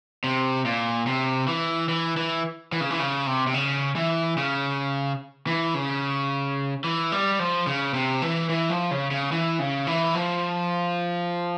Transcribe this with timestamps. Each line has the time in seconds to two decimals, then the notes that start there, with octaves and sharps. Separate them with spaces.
0.24 C3
0.65 A#2
1.07 C3
1.48 E3
1.89 E3
2.17 E3
2.72 E3
2.81 C#3
2.91 E3
2.99 C#3
3.27 C3
3.47 C3
3.54 C#3
3.96 E3
4.37 C#3
5.47 E3
5.74 C#3
6.84 E3
7.12 G3
7.39 F3
7.67 C#3
7.94 C3
8.22 E3
8.50 E3
8.70 F3
8.91 C#3
9.11 C#3
9.32 E3
9.59 C#3
9.87 E3
10.15 F3